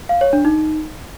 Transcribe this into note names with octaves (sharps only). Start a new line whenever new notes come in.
F5
C#5
D4
D#4